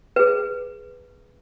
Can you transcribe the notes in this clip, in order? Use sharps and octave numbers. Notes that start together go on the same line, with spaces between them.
G#4 B4